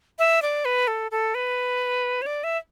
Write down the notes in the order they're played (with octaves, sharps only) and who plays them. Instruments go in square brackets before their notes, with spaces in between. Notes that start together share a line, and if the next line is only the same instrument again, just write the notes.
[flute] E5
D5
B4
A4
A4
B4
C#5
D5
E5